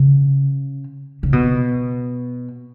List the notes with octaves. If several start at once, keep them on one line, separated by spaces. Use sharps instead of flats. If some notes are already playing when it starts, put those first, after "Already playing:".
Already playing: C#3
C#3
B2